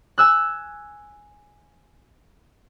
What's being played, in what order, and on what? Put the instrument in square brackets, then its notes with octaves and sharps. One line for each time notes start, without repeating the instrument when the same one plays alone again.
[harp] G#5 E6 F#6